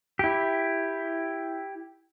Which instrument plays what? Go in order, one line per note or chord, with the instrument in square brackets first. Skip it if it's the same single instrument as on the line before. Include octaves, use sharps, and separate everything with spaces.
[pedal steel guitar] E4 G4